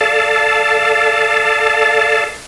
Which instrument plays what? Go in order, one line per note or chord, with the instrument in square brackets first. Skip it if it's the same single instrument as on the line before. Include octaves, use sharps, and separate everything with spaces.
[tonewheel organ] A4 D5 F5 A5